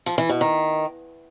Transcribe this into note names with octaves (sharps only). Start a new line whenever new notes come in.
F3
E3
B2
D#3